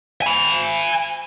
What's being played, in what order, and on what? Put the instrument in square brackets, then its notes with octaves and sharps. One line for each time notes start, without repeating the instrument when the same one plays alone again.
[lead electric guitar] G#5 B5